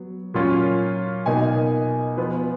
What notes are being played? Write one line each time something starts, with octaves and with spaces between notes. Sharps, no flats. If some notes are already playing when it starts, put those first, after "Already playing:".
Already playing: F#3 B3
A#2 F#3 C#4 F4
B2 A#3 D#4 G#5
F3 B3 F4